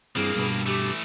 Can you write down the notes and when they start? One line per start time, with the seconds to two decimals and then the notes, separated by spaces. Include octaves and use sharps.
0.16 G2 E3 G3 A#3 C4 G#4
0.36 G2 B2 B4
0.66 E3 A3 G4